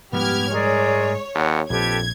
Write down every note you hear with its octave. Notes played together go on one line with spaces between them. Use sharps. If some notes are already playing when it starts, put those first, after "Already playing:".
G#2 F3 G3 B3 G4 F6 G#6
G#3 G#4 A#4 C#5 D5
D#2 F#5
A#1 F2 G4 A4 B4 G#6